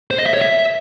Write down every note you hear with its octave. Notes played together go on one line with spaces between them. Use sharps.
C5
D#5
E5
C#5
E5